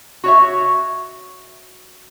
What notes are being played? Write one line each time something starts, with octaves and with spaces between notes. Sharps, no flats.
F#4 C#5 E5